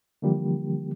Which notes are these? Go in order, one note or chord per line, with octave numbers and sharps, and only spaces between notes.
D3 E3 F3 G3 A#3 G4